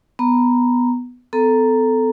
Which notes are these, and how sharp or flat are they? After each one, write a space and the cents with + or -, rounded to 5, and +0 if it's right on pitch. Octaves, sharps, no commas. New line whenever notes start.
B3 +0 A#5 +0
B3 +45 A4 +0 A#5 +0